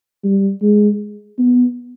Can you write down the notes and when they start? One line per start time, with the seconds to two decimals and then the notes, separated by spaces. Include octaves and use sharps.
0.24 G3
0.62 G#3
1.38 B3